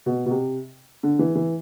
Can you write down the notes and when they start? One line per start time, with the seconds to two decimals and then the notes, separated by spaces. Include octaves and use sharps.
0.06 B2
0.26 B2
0.31 C3
1.03 D3
1.19 E3
1.35 E3